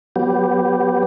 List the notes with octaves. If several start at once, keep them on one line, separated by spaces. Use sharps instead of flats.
F#3 B3 G4